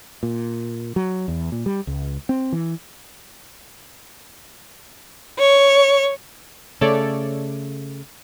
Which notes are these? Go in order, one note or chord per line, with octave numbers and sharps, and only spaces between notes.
A#2
F#3
E2
A#2
G3
C#2
C4
E3
C#5
C#3 A3 A4 C#5 D5